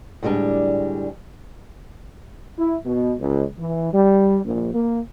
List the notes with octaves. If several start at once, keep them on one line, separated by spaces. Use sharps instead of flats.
D2 A2 G3 G#3 D4
E4
B2
C#2
E3
G3
A#1
A#3